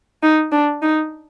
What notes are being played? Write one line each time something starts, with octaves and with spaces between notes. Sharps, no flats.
D#4
D4
D#4